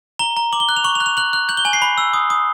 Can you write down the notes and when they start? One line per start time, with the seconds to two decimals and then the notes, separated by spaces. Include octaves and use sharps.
0.19 A#5 G7
0.36 A#5
0.53 D6 F#7
0.60 G7
0.69 F#6
0.76 F7
0.84 C#6 F#7
0.95 F7
1.00 F#6
1.06 F7
1.17 F#6 F#7
1.33 F#6
1.49 G6 F#7
1.57 G7
1.65 G#5 F#7
1.73 C7
1.82 B5
1.98 E6
2.13 D#6
2.30 D#6